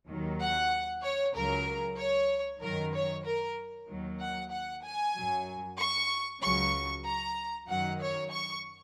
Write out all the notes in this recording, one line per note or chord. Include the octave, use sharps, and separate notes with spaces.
D#2 D#3 F#3
F#5
C#5
C#2 C#3 F#3 A#4
C#5
F#2 D#3 F#3 A#4
C#5
A#4
D#2 D#3 F#3
F#5
F#5
G#5
F#2 F#3
C#6
C#2 C#3 F#3 C#6
A#5
F#2 D#3 F#3 F#5
C#5
C#6